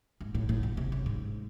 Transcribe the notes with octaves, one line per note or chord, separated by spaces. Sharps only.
G#2
A2
A2
B2
C3
C#3
G#2